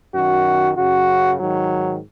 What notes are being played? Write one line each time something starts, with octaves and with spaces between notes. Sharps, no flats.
F#2 D#3 F#4
F#2 C#3 F#4
G#2 D#3 F#3